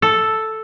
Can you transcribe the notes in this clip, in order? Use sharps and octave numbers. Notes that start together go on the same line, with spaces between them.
A4